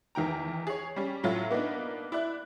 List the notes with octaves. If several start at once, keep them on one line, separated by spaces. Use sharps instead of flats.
E2 D#3 G5 A#5
G#4 C#5
G3 C#4
A2 F#3 F4
A#3 B3 D4 D#4
E4 D5 F#6